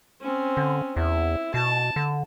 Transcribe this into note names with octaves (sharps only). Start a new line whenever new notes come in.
C4 C#4
D3
E2 E4
B2 A5
D3